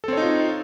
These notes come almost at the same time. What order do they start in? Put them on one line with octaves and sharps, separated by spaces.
A4 C4 C#5 D#4 F4